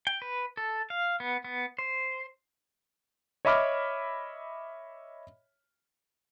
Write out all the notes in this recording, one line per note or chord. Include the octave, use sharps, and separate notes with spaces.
G5
B4
A4
F5
B3
B3
C5
C#5 D#5 E5 B5 D6 F6